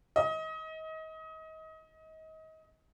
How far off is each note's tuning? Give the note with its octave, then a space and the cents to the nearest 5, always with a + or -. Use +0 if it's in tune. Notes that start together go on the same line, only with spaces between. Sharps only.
D#5 +30